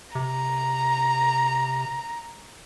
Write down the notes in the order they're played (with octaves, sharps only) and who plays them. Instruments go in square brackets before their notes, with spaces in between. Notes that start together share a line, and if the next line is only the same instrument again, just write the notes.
[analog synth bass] C3 [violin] A#5